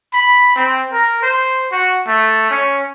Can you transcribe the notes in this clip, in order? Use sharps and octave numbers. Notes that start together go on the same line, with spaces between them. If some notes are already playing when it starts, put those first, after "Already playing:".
B5
C4
A#4
C5
F#4
A3
C#4